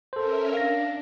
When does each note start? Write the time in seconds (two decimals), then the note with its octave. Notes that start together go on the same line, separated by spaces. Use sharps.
0.13 C#4 A4 A#4 C5 E5
0.53 D4 F5 A#6